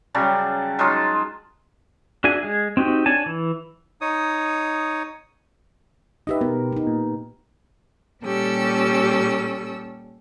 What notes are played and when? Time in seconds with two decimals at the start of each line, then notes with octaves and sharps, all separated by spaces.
0.14 C#3 F#3 G3 A5
0.79 F#3 G#3 D#4 F4
2.24 D4 F#4 G#4 E5 G#5
2.43 G#3 G#4
2.77 C4 D#4 F#4 G4
3.06 D4 C#5 G#5 A5
3.26 E3
4.01 D#4 C#5 D#6
6.27 D#4 G4 B4 D#5 E5
6.41 B2 A#4
6.72 B3 D#4
6.87 A#2
8.23 A#2 G3 C#4 G4 A4 E6